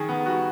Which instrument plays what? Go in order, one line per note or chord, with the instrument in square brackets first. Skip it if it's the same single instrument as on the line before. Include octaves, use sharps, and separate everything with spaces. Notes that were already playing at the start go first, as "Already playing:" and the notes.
Already playing: [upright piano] D#3 G#4
B3
G3 F#4